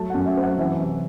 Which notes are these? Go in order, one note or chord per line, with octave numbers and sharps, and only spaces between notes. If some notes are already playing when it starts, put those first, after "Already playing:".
Already playing: F#3 A3 A5
F#2 F#5
E5
C4
F#5
E3 E5
C3